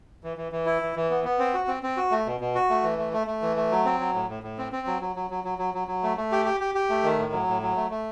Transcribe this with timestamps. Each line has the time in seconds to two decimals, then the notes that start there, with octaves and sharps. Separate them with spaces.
0.23 E3
0.37 E3
0.52 E3
0.66 E4
0.82 E3
0.96 E3
1.10 B3
1.24 B3
1.39 C4
1.54 F#4
1.68 C4
1.83 C4
1.97 F#4
2.11 A3
2.26 B2
2.40 B2
2.55 F#4
2.70 A3
2.83 E3
2.98 A3
3.13 A3
3.27 A3
3.42 E3
3.56 A3
3.71 F#3
3.85 C4
4.00 F#3
4.14 A2
4.29 A2
4.43 A2
4.58 C4
4.72 C4
4.87 F#3
5.01 F#3
5.16 F#3
5.30 F#3
5.44 F#3
5.58 F#3
5.74 F#3
5.88 F#3
6.03 A3
6.17 A3
6.32 G4
6.45 G4
6.60 G4
6.75 G4
6.89 A3
7.03 D#3
7.19 A2
7.32 F#3
7.47 A2
7.62 F#3
7.76 A3
7.90 A3